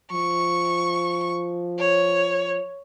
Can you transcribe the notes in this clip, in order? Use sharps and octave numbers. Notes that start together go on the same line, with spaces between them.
F3 C#6
C#5